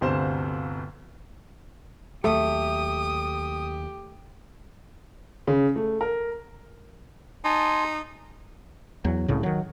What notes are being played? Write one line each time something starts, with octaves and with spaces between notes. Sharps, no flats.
G1 D2 C3 C5 F5 E7
D#2 F#3 A3 G4 D#6
C#3
A3
A#4
D#4 G#5 A5 C6
E2 F#3
C2 A2 C#3
D#3 F#3